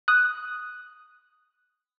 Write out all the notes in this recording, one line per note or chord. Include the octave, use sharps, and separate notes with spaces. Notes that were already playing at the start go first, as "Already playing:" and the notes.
D#6 F#6